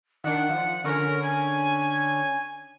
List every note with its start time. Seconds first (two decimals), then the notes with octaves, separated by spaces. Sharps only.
0.24 D#3 D4 F#5
0.49 F3
0.84 D3 C#4 A#4
1.23 G#5